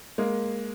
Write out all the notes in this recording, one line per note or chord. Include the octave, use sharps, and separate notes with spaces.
G#3 A#3